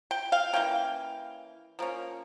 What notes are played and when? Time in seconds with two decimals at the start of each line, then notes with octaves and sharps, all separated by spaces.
0.11 G5
0.32 F5
0.53 E3 A#3 C#4 G5
1.79 F3 A#3 C#4